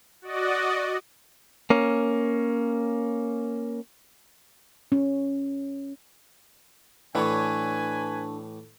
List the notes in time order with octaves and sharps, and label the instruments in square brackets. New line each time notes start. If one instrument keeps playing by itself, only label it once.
[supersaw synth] F#4 D5 D#5
[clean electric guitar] A#3 C#4
[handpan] C#4
[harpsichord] A2 E3 [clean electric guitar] D4 A4 C#5 [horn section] B4 G#5